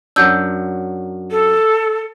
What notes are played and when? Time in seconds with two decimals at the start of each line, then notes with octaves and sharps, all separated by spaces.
0.16 F#2 F#3 D4 E6 G6
1.31 A4